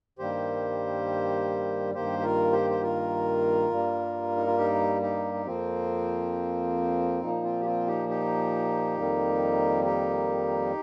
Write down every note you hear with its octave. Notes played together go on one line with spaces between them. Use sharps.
G2 D#3 G3 A#3 G4 C5
G2 D#3 A#3 G4 C5
G4
F4 A#4
G4 C5
C5
F4 A#4
G2 G3 A#3
D#4
F4
D#4 G4
D#4 G4
D#4
F2 F3 A#3 C4
A#2 F3 A#3 D#4
C4 F4
G4
C4 F4
D#4 G4
D#4 G4
F2 D#3 G3 A#3
D#4 G4